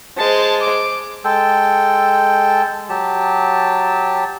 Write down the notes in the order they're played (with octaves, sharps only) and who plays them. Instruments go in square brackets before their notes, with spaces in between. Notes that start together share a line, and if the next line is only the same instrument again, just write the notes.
[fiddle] G#3 C5 [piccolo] A5
[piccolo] D6
[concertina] G#3 A4 G5
[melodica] F#3 G4 A5